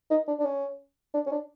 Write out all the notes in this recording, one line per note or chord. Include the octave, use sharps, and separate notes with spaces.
D#4
D4
D4
C#4
D4
C#4
D4